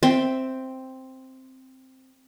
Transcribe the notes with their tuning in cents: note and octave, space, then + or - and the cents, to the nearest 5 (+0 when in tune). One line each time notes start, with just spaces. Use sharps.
C4 +0 E5 +0 G5 +0